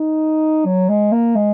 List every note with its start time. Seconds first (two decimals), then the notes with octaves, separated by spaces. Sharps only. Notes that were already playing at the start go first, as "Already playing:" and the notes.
Already playing: D#4
0.65 F#3
0.89 G#3
1.12 A#3
1.36 G#3